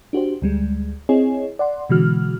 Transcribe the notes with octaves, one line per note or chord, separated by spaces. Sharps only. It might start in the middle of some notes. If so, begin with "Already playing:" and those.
D4 F#4 G4 C5
D2 G3 G#3
C4 E4 G#4 C#5 D#5 G#5
D5 F#5 C6
B2 D3 E3 G#3 F#4 F6